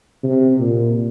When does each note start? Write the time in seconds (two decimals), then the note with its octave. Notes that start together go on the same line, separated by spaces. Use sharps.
0.23 C3
0.59 A#2